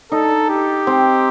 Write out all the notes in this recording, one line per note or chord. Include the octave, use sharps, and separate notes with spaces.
D#4 A4
G4
C4